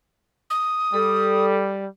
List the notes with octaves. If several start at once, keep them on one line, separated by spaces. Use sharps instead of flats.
D#6
G3 A4